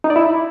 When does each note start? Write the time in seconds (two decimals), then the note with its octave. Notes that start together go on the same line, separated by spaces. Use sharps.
0.04 D#4
0.10 D5
0.16 E4